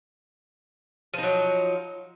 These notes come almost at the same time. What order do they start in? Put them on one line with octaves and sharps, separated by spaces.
F3 D#4 F#3